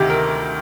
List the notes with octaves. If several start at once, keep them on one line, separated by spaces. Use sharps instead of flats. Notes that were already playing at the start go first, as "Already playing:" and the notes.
Already playing: D2 C3 D#3 G4
A#4